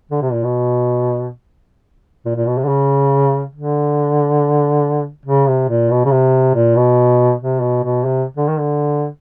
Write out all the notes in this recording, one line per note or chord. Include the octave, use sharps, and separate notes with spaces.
D3
C3
A#2
B2
A#2
A#2
B2
C3
D3
C#3
D3
C#3
C3
A#2
B2
C#3
C3
A#2
B2
C3
B2
B2
C3
D3
D#3
D3